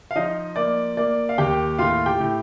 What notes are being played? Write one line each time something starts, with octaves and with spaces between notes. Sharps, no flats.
F5
F3 D#4 D#5
A#3 D5
A#3 D5
F5
D#2 G4 G5
A2 F4 F5
G4 G5
A2